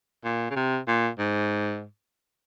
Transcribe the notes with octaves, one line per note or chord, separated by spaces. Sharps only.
A#2
C#3
C3
A#2
G#2